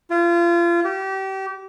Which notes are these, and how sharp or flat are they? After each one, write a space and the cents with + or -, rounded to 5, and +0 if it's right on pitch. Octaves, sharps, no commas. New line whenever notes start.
F4 -30
G4 -30